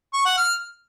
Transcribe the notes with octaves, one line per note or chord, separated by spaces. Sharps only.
C#6
F#5
F6